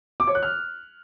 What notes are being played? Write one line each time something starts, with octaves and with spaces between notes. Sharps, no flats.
D6
C#5
F#6
F6